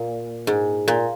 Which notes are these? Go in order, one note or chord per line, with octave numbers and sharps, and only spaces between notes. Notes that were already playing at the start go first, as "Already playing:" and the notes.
Already playing: A#2
G#2
A#2